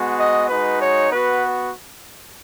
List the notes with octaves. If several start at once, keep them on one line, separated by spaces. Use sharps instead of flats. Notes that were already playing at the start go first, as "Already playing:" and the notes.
Already playing: G#3 B3 F#4
D#5
G#3 D#4 F#4 B4
C#5
B3 F#4 B4